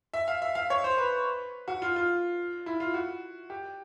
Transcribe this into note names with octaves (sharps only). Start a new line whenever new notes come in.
E5
F5
E5
F5
C#5
C5
B4
F#4
F4
F4
E4
F4
F#4
G4